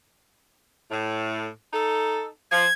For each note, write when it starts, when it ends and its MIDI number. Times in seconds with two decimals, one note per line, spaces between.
0.90 1.48 45
1.73 2.26 63
1.73 2.26 69
2.51 2.66 53
2.51 2.74 92